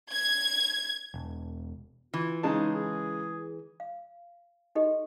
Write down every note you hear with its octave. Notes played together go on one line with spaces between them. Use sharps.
G#6
E1
E3 F4
C#3 G#3 D#4 A5
G#4
F5
D#4 F#4 G4 A4 D#5